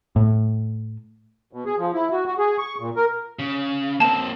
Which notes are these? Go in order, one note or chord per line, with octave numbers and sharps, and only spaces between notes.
A2
B2
G#4
F3
E4
F#4
F#4
G#4
C#6
A#2
A#4
C#3
A#3 C4 A5 E7